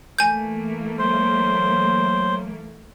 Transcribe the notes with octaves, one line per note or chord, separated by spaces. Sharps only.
E3 A3 A#3 G#5 G6
F#3 C5